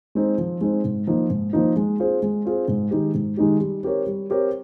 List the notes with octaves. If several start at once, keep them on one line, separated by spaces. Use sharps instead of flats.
G#3 C4 D#4
F3
G#3 C4 D#4
G#2
F3 A#3 D#4
G#2
F3 A#3 D#4
G#3
C4 F4 G#4 C5
G#3
C4 F4 G#4 C5
G#2
D#3 G#3 D#4 G4
G#2
D#3 G#3 D#4 G4
G3
C4 G4 A#4 C#5
G3
C4 G4 A#4 C#5